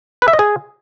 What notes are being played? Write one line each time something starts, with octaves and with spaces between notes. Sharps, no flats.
B4
E5
D#5
G#4